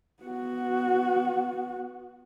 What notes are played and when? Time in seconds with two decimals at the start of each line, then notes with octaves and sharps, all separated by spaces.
0.23 B3 F#4